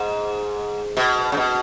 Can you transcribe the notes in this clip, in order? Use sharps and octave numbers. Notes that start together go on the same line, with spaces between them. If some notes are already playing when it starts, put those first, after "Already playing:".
Already playing: G#2
B2
C#3
B2